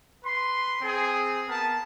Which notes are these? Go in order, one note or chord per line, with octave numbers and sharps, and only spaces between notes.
B4 C6
C4 G#4
B3 A#4 A5